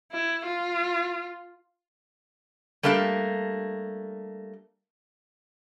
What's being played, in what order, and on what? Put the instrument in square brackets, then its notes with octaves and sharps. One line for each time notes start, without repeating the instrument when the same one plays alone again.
[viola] E4
F4
[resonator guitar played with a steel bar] G3 A3 A#3 D4 G4